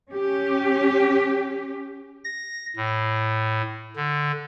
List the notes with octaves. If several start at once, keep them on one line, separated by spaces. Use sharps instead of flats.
C#4 G4
A#6
A2
D3